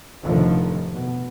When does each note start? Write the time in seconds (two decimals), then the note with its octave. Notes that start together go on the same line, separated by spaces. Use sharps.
0.21 F1 A2 D3 D#3 F3
0.91 B2